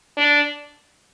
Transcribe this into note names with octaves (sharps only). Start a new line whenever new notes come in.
D4